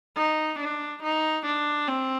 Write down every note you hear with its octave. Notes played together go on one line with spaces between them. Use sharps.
D#4
D4
D#4
D4
C4